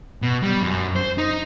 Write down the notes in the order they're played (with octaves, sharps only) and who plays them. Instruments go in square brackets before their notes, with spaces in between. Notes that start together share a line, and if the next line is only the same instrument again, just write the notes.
[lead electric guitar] B2
G3
F#2
C5
D#4